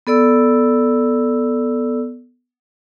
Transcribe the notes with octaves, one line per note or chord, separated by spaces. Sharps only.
B3 A4 D5 E6